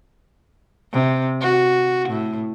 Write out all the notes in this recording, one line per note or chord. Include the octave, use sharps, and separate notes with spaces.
C3
F#4
A2